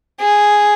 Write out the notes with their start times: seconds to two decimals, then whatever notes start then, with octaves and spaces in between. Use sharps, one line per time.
0.21 G#4